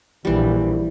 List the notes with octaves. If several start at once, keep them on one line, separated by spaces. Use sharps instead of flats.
A#1 E3 G3